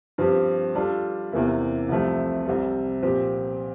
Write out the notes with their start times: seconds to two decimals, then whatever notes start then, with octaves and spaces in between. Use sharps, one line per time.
0.18 G2 F3 C4 G4
0.75 G3 D4 F4 A4
1.32 E2 C3 E3 A#3 E4
1.89 C2 C3 F3 A3
2.46 C2 C3 G3
3.03 A#2 F3 C4 G4